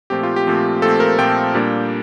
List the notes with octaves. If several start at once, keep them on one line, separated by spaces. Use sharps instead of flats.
A#2 F3 A3 C4 G4
F4
G4
A#2 F3 A3 C4
A#2 F3 A3 C4 A4
A#4
A#2 F3 A3 C4 G5
A#2 G3 A#3 D4